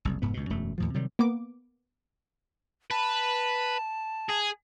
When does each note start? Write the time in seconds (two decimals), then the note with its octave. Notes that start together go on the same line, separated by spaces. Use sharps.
0.05 F#1 C2
0.22 F1 G#2 B3
0.34 C#2 B2
0.50 E1 F#2 A3
0.78 D#2 A2 F3
0.94 C3 D#3 F#3 G3
1.19 A#3 B3 D6
2.91 B4 A5
4.29 G#4